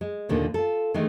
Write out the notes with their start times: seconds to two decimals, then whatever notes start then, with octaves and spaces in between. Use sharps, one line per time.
0.01 G#3
0.29 D#2 A#2 D3 D#3
0.54 F4 A4
0.94 D#3 E3 G#3 A3 D4